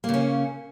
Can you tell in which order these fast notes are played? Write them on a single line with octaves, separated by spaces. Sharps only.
A#3 C#3 C#4